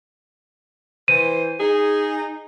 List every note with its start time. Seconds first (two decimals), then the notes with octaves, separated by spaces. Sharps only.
1.08 E3 C5 D#7
1.59 D#4 G#4